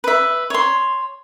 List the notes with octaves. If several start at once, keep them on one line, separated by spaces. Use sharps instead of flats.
B4 E5
C#5 C6